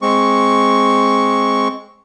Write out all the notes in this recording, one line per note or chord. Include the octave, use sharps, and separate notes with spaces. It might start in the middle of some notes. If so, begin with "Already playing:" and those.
G#3 C4 C#6